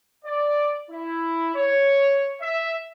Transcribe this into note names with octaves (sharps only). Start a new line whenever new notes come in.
D5
E4
C#5
E5